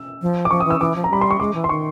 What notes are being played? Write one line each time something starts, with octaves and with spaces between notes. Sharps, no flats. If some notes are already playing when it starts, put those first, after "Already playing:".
Already playing: E6
F3
D6
F3 C#6
D#6
E3 E6
E3 D6
F3
A#5
G3 B5
C6
C#6
G#3 D6
E3
C6
D#3 C#6